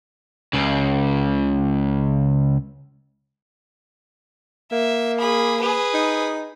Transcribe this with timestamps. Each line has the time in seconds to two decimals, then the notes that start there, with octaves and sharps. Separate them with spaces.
0.53 C#2 C#3
4.72 A#3 E5
5.20 G#4 B5
5.61 G#4 B4
5.94 D#4